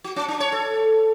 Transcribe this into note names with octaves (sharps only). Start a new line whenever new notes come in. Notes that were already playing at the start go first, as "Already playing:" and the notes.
F#4
C#4
D4
C#5
A4